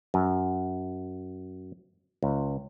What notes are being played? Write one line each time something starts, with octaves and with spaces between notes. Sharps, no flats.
F#2
C#2